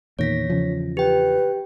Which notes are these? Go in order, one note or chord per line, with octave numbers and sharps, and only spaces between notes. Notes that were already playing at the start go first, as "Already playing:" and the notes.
E2 A#2 D#3 C#5 A#6 B6
E2 C#3 F3
G4 B4 G5